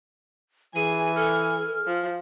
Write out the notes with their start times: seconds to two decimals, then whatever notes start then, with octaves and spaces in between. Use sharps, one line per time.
0.76 E3 G#4 G#5 D#7
1.16 A4 F6
1.87 F3